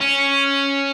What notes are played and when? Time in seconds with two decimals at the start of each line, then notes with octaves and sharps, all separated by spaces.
0.01 C#4